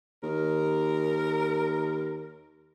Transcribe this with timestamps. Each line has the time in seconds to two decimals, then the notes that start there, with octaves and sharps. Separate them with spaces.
0.23 D#2 A#4